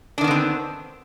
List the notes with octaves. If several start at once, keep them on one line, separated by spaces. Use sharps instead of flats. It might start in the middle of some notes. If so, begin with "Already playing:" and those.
D3 D#3 B3 C4 D4